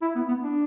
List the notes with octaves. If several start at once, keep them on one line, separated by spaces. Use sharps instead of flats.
E4
B3
B3
D4